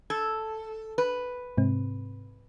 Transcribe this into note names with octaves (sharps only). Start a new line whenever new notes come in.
A4 G#6
B4
G#2 C3 C4